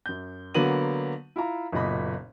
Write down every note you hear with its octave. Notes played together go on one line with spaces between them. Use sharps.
F#2 G6
D3 F#3 A#3 B3 D#7 F#7
E4 F4 A#5
F#1 B1 A#2 D#5 B5